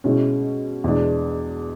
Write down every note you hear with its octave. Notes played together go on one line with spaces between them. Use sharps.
B2 G#3 C#4 E4
E2 B2 G#3 D4